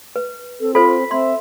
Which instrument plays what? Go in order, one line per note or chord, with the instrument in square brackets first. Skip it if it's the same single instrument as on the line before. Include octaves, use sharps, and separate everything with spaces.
[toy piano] B4
[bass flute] C4 [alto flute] A4
[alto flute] F4 [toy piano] A4 C5 [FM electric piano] B5
[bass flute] C4 [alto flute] E5 [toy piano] C6